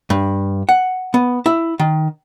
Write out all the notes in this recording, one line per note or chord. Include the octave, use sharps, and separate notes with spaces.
G2
F#5
B3
E4
D#3